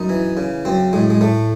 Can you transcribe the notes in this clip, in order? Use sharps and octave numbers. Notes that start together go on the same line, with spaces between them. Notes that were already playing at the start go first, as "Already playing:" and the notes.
Already playing: F#2 D#4
E3
C#3
F#2 C4
A2 G#3
G#3
A2 A3